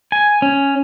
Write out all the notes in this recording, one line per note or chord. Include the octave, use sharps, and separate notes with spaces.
G#5
C#4